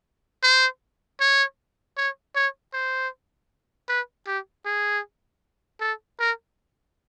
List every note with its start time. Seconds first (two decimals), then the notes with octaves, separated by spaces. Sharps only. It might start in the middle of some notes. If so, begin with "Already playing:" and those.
0.43 C5
1.20 C#5
1.97 C#5
2.35 C#5
2.73 C5
3.89 B4
4.27 G4
4.65 G#4
5.80 A4
6.19 A#4